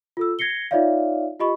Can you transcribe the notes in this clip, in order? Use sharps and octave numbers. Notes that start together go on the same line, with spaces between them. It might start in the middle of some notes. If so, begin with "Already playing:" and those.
F4 A4 E6
G#6 A#6 C7 C#7 G7
D#4 F4 C#5 D5 E5 F5
F4 G4 D#5 B5 C#6